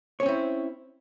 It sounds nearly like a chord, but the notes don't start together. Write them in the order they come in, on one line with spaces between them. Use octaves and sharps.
C#5 C#4 C4 E4